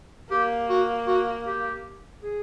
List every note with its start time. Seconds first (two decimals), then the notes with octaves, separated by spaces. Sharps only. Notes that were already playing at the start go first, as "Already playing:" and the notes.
0.31 A#3 G4
0.69 F#4
1.07 F#4
1.47 G4
2.23 G#4